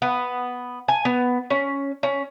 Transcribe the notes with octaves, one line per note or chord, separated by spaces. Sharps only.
B3
G#5
B3
C#4
C#4